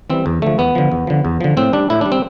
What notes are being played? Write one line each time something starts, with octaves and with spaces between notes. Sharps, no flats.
E3 G3 C4
E2
D3 F3 A3
E2 B3
D3 F3
E2
D3 F3
E2
D3 F3
A2 C4
G3 D4
A2 E4
G3 D4
C4